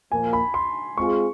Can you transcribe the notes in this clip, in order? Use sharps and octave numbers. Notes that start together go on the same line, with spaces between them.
A#2 F3 A#3 G#5
B5
C6
G#3 C4 F4 G#4 C#6